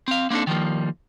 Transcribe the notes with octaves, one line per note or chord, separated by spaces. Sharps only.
C4 F5
A#3 C4 D4 D#4 A4
D#3 F3 G3 A#3